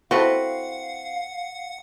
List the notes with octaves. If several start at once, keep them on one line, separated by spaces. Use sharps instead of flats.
C4 E4 F#4 A4 B4 F5 F#5